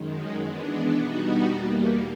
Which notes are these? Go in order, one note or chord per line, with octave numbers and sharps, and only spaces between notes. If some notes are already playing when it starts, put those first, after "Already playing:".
Already playing: F#2 D#3 G#3
E3 G#3 B3 D4
B2 G3 B3 D#4 F#4
E2 B2 G3 A#3